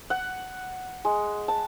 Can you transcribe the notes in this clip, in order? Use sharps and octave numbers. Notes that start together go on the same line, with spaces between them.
F#5
G#3
A5